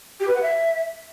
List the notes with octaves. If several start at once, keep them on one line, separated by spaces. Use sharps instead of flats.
G4
B4
F#5
E5